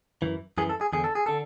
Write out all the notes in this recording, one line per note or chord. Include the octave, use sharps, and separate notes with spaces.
F#2 E3
F#2 E3 G#4
A4
G#4
E2 D3 G#4
A4
G#4
D3 A4